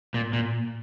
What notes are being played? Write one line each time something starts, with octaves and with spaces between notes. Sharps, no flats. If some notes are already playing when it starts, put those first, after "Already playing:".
A#2
A#2